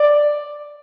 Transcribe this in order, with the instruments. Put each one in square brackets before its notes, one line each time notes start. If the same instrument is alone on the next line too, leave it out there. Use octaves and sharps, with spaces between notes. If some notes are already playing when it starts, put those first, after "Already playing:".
Already playing: [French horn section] D5